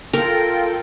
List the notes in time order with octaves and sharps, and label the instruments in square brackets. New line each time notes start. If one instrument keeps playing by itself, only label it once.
[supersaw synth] F4 A4 G5 [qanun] A#4